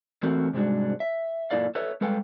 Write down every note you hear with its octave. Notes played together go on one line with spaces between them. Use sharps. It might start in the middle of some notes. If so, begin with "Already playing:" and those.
E3 A3 C4 F#4 A4 A#4
G#2 C3 G3 G#3 D4 F#4
E5
F#2 A#2 E4 A4 D5 F5
A4 B4 C#5 E5
G3 G#3 A4 B4 F5 G5